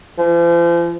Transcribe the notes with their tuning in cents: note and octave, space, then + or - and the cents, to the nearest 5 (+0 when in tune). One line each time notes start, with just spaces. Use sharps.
F3 -40